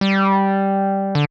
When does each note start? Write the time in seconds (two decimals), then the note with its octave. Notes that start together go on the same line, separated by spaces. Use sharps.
0.01 G3
1.15 D3